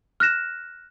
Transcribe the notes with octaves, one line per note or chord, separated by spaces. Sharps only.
F6 F#6 A#6 E7